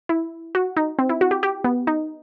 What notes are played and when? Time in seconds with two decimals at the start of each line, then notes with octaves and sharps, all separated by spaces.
0.09 E4
0.55 F#4
0.77 D#4
0.99 C4
1.09 E4
1.21 F#4
1.31 G4
1.43 G4
1.64 B3
1.87 D#4